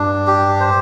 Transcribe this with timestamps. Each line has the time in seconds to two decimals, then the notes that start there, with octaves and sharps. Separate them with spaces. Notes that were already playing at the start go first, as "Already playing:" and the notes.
Already playing: G2 D4
0.27 G4
0.60 C5